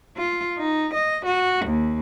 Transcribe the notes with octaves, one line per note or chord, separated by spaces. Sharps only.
F4
D#4
D#5
F#4
D#2